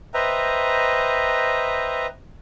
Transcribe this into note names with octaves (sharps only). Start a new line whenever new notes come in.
B4 C5 D#5 E5 G5 A#5